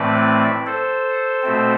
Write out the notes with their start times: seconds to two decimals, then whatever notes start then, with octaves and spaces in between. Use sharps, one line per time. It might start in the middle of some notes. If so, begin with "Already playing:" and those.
Already playing: A2 E3 A3 C4 B4 D5
0.66 A4 C5
1.43 B2 A3 C4